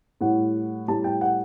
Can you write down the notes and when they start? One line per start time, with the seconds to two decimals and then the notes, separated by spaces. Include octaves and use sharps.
0.21 A2 G3 F#5
0.88 A2 G3 A5
1.04 G5
1.21 F#5